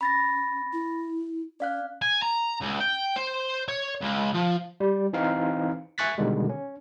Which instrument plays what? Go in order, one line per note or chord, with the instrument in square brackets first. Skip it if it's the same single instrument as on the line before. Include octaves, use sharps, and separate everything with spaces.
[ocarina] C#4 [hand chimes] B5 A6 A#6
[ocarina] E4
[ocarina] C#4 [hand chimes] D5 F5 F#6
[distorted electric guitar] G#5
A#5
C#2
G5
C5
C#5
C#2
F3
[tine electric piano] G3
E3 C4 D#4 F5
E5 G#5 C#6 F#6 A6 B6
B2 D3 D#3 G3 G#3
C#4